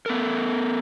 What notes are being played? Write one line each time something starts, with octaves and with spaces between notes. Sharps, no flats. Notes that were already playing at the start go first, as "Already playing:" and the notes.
B3 A4 A#4